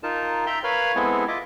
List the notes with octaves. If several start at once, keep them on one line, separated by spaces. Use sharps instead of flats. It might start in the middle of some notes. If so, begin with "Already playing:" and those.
D#4 F4 A#4 A5
E5 G5 A#5 C6
A#4 B4 C#5 F5 B5 F6
G#3 B3 C4 E4 G#4 A4
F4 D#5 E5 D6